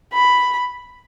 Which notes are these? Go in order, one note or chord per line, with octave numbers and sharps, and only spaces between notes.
B5